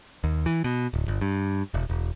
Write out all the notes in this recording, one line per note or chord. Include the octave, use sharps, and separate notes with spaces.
D#2
E3
B2
D1
G1
G2
E1
E1